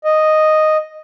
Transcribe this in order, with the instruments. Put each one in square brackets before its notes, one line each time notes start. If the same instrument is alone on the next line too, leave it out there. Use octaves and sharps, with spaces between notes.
[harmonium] D#5